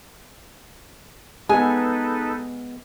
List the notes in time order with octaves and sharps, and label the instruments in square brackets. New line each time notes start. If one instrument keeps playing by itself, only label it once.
[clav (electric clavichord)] G#3 B3 [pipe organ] D#4 A4 B4 [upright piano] G#4 [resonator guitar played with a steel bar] G#5